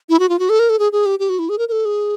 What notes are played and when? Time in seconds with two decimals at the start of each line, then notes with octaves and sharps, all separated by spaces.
0.09 E4
0.19 F#4
0.29 F4
0.39 F#4
0.49 A4
0.59 A#4
0.69 A4
0.79 G#4
0.92 G#4
1.06 G4
1.19 G4
1.29 F#4
1.39 E4
1.49 G#4
1.58 A#4
1.68 A#4
1.72 A4
1.85 G#4